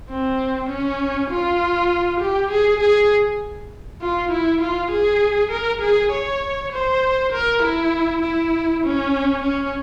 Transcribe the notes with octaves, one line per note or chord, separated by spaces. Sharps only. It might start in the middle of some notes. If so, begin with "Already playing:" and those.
C4
C#4
F4
G4
G#4
G#4
F4
E4
F4
G#4
A#4
G#4
C#5
C5
A#4
E4
E4
C#4
C#4